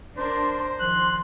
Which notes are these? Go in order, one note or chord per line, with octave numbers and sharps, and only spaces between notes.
D4 A#4 C5 C6
D#3 F3 C6 F#6